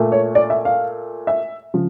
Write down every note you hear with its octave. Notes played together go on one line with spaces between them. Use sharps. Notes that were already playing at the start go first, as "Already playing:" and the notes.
Already playing: A#2 A3
C#5
D5
E5
F5
E5
C#3 F3